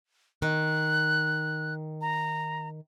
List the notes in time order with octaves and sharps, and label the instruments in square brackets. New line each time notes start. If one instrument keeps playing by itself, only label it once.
[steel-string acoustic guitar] D#3 [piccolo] F#6
[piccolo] A#5